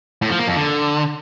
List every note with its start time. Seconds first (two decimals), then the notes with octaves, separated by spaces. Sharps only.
0.22 A2
0.30 F3
0.39 A#3
0.48 F2
0.56 D3